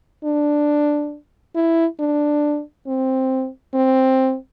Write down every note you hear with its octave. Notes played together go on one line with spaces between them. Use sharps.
D4
E4
D4
C4
C4